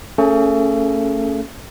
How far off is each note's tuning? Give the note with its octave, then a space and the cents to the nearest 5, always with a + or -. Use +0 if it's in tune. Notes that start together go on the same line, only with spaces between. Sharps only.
A3 +40 C#4 +0 G#4 +45